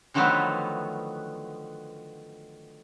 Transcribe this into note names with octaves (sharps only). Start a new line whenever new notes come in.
D3 D#3 F3 F#3 A3 B3